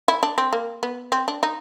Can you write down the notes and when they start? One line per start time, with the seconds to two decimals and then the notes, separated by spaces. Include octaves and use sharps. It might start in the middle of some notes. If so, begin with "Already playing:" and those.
0.08 E4
0.23 D4
0.38 C4
0.53 A#3
0.83 B3
1.12 C4
1.28 D4
1.43 D#4